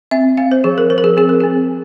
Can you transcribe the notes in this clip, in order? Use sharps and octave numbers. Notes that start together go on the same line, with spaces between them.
C4 E5
C4 F5
C5
F3 G#4
A#4
F3 C5
A#4
G#4
C4 G#4
A#4
C4 G#4